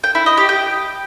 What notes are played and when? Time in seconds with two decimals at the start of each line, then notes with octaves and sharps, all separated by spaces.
0.04 G5
0.15 E4
0.26 D#5
0.38 G4
0.49 G5